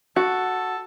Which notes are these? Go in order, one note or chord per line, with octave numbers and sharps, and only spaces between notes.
F#4 A4